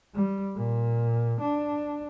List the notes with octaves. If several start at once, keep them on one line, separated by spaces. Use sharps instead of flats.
G3
A#2
D4